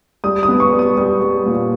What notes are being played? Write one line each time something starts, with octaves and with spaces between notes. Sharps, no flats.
G3 D#6
D#6
B3
C#6
G3
D#6
G3
G3
A#2